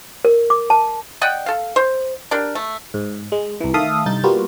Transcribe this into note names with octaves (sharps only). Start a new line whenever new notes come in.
A#4
D6
A5
D5 D#5 F#5 G5
A4 F5
C5
D4 G4 A#4
A3
G#2
G#3
C2 E3
D#3 A3 A4 E5 F5 D#6
C2 G2 D#4 G6 A6
G3 A#3 B3 F4 F#4